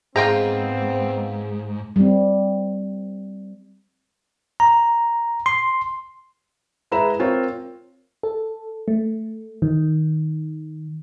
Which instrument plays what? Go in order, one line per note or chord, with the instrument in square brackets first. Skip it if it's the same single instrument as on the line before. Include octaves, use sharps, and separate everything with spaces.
[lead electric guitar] G#2 [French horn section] B3 C4 [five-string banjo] F4 G5 A#5 [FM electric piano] G#4 F5
[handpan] G3 C4
[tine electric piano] A#5
C6
[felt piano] G#3 E4 B4 A#5 B5 E7
C4 F4 A#4 C#5
[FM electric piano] A4
A3
D#3